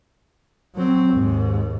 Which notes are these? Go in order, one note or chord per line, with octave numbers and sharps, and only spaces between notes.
F#3 C4
D#2 G#2